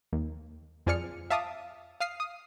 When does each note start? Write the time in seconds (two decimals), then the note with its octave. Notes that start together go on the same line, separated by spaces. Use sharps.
0.13 D#2
0.86 F2 F3 G#4 D5 F6 C#7
1.30 E5 F5 A5 D6 D#6
2.00 F5 D#6 F6 C7
2.20 D#6